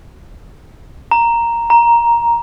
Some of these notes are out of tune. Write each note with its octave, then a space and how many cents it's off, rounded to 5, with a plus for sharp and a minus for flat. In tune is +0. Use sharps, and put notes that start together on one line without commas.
A#5 +0
A#5 +10